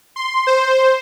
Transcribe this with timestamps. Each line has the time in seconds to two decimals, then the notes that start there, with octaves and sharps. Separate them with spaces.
0.16 C6
0.47 C5